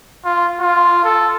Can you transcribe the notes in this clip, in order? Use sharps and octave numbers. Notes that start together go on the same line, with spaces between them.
F4
F4
A4